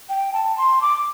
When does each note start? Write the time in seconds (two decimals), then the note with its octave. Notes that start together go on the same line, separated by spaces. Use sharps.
0.09 G5
0.33 A5
0.58 C6
0.82 D6